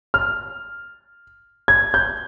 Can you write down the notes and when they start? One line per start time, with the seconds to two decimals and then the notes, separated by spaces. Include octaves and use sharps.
0.14 F6
1.68 G#6
1.94 G6